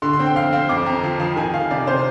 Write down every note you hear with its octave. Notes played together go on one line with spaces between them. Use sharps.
D3 C6
C6
C4
G5
F2 F5
C4 F5
F2 D6
F2 A#5
F3
F3
D#3 G#5
D#3 F5
C3 D5
C3 C5